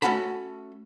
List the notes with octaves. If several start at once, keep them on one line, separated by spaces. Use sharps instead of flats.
A3 C#4 F#4 F#5 A5 B5